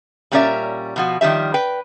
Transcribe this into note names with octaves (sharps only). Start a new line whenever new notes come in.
A#2 G3 C#4 A#4 D5 E5
B2 F3 F#4
D#3 F3 G3 E5
B4 G5